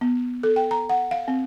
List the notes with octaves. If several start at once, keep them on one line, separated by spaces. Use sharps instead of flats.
B3
A4
G5
A#5
F#5
F5
C4